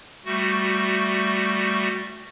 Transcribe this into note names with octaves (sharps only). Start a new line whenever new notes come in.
G3 A3 F#4